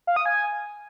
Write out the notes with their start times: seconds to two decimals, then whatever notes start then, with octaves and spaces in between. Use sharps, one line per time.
0.07 F5
0.16 D#6
0.26 G#5